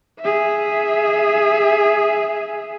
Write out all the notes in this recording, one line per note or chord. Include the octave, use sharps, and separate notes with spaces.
G#4 E5